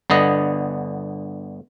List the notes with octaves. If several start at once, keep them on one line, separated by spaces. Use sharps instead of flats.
G1 D3 B3 D#5